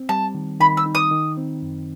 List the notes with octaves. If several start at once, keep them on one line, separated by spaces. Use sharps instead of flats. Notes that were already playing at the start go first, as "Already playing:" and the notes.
Already playing: C4
G3 A5
D#3
D#3 B5
E6
D#4
D#6
D#3
C4
F#2